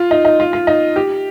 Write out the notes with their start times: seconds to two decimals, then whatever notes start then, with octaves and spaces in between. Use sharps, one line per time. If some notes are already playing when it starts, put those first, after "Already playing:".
Already playing: F4
0.11 D#4
0.25 D#4
0.40 F4
0.53 F4
0.67 D#4
0.96 G4